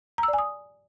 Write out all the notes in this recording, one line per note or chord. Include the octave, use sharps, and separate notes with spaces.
A#5
E6
D5
G#5
D#6